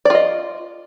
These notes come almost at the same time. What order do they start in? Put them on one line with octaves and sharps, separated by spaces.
D5 F4 D#5